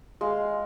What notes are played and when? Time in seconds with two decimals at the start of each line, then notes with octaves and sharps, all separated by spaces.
0.21 G#3 F5